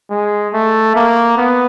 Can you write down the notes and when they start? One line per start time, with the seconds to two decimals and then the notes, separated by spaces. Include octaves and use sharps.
0.10 G#3
0.54 A3
0.96 A#3
1.38 B3